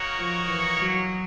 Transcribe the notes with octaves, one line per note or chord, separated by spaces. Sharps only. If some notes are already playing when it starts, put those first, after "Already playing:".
Already playing: A#3 D#4 F#4 A#4 C#5
F3
E3
F#3